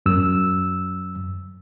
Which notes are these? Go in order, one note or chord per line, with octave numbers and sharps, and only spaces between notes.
F#2 E6